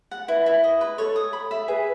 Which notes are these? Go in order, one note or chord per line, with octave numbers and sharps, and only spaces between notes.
F#5
E4 B4
E4
D#5
B4
A4 C#5
D#6
B5
E5
G#4 B4